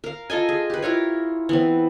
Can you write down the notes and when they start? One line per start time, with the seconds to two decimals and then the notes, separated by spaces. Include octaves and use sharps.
0.04 A#4 F5
0.30 F4 A4 D#5 G#5
0.49 G#4
0.70 G4 B4
0.82 E4 F4 A#4 C#5
1.49 E3 B3 C4